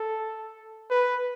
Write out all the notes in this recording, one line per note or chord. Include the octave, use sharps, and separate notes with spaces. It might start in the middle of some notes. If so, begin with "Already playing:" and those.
Already playing: A4
B4